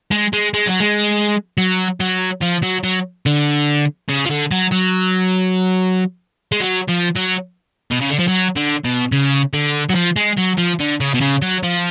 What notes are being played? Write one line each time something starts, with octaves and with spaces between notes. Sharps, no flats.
G#3
G#3
G#3
F#3
G#3
F#3
F#3
F3
F#3
F#3
D3
C#3
F3
D3
F#3
F#3
G#3
F#3
F3
F#3
B2
C#3
D3
F3
F#3
D3
B2
C#3
D3
F#3
F3
G#3
F#3
F3
D3
C#3
B2
C#3
F#3
F3